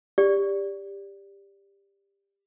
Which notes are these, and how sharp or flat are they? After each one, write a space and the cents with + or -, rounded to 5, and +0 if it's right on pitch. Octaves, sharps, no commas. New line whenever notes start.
G4 +15 D5 -15